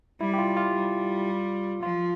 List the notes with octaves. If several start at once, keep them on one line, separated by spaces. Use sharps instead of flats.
G3 E4
G4
F4
F4
G3
F3 F4